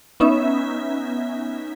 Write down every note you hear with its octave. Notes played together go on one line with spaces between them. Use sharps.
B3 C#4 D#4 E5